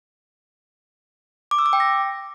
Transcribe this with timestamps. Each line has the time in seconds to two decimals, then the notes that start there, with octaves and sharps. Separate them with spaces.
1.51 D6
1.59 E6
1.66 D6
1.73 G5
1.80 A#6